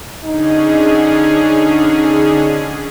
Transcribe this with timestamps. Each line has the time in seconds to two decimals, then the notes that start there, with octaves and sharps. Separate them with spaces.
0.25 D3 C#4 D#4 G#4